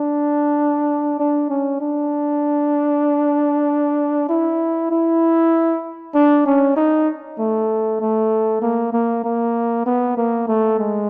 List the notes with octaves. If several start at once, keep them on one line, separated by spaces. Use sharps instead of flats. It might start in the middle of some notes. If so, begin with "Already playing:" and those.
Already playing: D4
D4
C#4
D4
E4
E4
D4
C#4
D#4
A3
A3
A#3
A#3
A#3
B3
A#3
A3
G#3